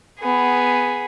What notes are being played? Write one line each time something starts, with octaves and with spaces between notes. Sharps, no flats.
B3 G#4